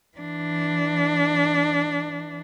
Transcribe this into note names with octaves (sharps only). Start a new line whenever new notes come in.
E3 D4